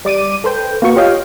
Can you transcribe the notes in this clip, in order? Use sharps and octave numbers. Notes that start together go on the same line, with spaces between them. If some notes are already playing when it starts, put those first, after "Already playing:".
G3 D5 D6 D#7
A4 B4 C5 G5
A#3 B3 F#4 C#6
F4 G4 C#5 D#5 F5 G5